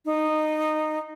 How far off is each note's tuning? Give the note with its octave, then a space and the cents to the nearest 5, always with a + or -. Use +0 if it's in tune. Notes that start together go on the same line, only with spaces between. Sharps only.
D#4 -15